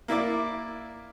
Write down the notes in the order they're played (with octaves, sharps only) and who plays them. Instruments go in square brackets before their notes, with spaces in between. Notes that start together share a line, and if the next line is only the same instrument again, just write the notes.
[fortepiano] A#3 E4 D5 D6